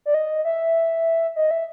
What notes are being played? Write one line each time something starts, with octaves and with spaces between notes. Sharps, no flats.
D5
D#5
E5
D#5
E5